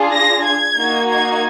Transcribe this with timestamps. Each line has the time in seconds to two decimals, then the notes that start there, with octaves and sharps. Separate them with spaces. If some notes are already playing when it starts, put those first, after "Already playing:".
Already playing: D4 F4 G#4
0.12 A#6
0.45 G#6
0.77 A#3 D#4 F#4
1.09 G#6